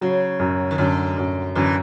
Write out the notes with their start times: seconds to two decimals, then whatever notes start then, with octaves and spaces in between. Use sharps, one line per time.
0.01 C#3 F#3
0.39 F#2
0.71 D#3
0.78 F#2 D3
1.18 F#2
1.55 F#2 D3 E3